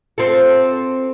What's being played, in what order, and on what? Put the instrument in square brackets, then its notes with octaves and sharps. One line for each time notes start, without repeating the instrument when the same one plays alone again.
[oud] C4 F4 A4